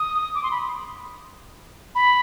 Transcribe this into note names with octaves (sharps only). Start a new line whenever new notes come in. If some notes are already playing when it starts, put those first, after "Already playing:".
Already playing: D#6
D6
C6
B5
B5